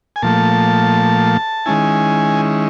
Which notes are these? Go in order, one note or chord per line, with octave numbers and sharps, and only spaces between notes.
G#5
A#2 F3 A3 A5
D#3 G#3 C#4 E4 G#5